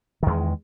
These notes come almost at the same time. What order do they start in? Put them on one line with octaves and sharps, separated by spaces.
D#3 E2 G#3